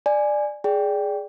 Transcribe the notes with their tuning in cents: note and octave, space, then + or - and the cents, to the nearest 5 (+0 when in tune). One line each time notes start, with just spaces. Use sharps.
D5 +15 G#5 +0
G#4 +0 D5 -10 G5 +0